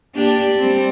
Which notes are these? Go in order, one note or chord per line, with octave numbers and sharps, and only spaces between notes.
A#3 D4 G4
G3 C4